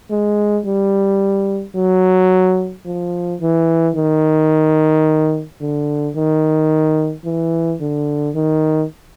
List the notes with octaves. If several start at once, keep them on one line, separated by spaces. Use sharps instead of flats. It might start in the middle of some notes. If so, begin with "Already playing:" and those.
G#3
G3
F#3
F3
E3
D#3
D3
D#3
E3
D3
D#3